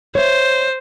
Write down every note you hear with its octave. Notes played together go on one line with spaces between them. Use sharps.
C5 C#5 E5